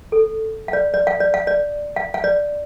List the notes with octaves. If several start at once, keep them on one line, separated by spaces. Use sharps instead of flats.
A4
F5
D5
D5
F5
D5
F5
D5
F5
F5
D5